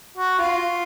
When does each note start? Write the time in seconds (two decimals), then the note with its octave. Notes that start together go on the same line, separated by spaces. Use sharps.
0.17 F#4
0.39 F4